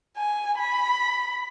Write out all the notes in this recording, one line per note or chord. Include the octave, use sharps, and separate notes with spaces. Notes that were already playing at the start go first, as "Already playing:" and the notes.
G#5
B5